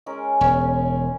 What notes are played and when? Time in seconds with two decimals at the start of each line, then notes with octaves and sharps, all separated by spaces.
0.06 G#3 C#4 A#4
0.41 E1 C#4